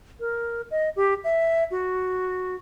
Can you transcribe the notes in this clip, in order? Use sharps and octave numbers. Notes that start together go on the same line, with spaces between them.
A#4
D#5
G4
E5
F#4